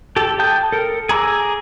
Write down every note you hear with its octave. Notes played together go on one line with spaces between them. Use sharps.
G4 A4
G5 A5 D#6 G6
A4 A#4
G#4 A#5 D6 E6